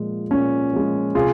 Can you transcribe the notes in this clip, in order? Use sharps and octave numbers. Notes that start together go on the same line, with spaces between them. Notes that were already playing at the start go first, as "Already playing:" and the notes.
Already playing: A#2 F3 G#3
A#2 C#4
F3 G#3
C3 F4 G#4